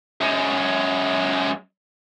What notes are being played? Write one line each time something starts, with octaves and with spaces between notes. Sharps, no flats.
F#2 G#3